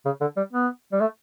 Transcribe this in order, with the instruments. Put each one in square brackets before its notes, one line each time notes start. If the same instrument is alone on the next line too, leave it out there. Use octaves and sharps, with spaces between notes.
[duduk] C#3
D3
G3
B3
G3
A3